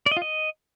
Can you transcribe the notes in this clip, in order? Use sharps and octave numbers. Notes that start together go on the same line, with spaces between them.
D5
D#5
F4
D#5